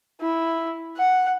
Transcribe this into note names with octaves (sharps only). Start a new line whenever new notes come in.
E4
F#5